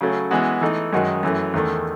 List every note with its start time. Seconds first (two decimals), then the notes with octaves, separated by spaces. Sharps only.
0.01 C#3 F#3 A3 C#4
0.31 E3 G#3 B3 F#4
0.61 E3 A3 D#4
0.93 F#2 D#3 G#3 D#4 F#4
1.23 F#2 E3 A3
1.54 E2 D#3 A3